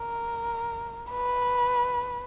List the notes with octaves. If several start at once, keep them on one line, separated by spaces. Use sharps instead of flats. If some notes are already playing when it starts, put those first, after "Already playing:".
Already playing: A#4
B4